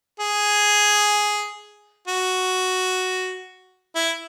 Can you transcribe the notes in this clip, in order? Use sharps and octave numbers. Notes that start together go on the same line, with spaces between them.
G#4
F#4
E4